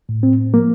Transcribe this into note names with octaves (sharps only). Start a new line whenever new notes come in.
A2
C4
F3 A#3